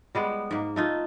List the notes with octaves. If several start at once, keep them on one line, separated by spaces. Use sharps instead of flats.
G3 G#3 B3
G#2 A#3
A3 D#4 F4